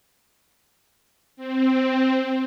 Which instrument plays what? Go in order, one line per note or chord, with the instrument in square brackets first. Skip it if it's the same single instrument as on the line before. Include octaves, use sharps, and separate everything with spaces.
[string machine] C4